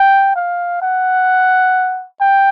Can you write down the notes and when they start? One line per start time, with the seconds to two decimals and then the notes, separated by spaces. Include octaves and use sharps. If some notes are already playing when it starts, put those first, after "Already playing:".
Already playing: G5
0.36 F5
0.82 F#5
2.21 G5